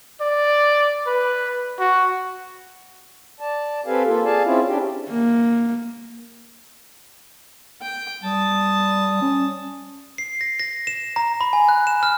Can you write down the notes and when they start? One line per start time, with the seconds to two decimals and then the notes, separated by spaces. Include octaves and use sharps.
0.21 D5
1.07 B4
1.79 F#4
3.40 D5 A5
3.86 C4 G4 A4 B4 F5 G#5
4.06 A#3 F4 A4
4.24 G#4 D5 F5 G#5 A5
4.43 C4 C#4 E4 F4 G#4
4.67 C#4 D4 G4
5.10 A#3
7.81 G5
8.23 G3 A5 D#6
9.22 C#4
10.18 C7
10.41 A#6
10.60 A#6
10.87 E7
11.16 A#5
11.41 B5
11.53 G#5
11.69 F#6
11.87 E7
12.03 F6